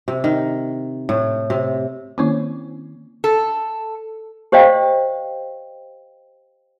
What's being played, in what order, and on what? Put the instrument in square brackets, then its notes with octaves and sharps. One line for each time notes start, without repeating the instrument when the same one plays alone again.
[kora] C3
D#3
A2
C3
[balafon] D#3 A#3 E4 [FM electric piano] C4 C#4
[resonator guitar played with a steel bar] A4
[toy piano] G4 C5 D5 D#5 F5 G5